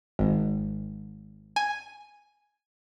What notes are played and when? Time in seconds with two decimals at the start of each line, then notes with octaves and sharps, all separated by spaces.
0.19 G#1
1.56 G#5